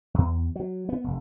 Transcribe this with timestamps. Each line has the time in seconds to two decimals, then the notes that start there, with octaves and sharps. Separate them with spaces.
0.14 E2
0.56 F#3
0.89 B3
1.04 F1